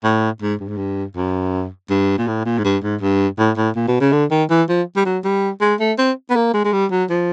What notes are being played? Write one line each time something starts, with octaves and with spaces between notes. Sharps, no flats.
A2
G#2
G2
G#2
G2
F#2
G2
A#2
A2
A#2
G#2
G2
G#2
G2
A2
A2
A#2
B2
C#3
D3
D#3
E3
F3
G3
F#3
G3
G#3
A3
C4
B3
A#3
G#3
G#3
G3
F#3
F3